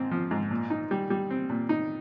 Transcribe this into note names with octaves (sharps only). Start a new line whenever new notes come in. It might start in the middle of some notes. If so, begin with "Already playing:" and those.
Already playing: G#2 C4
F3
G#2
A#2
D#4
G3
G3
C4
A#2
D#4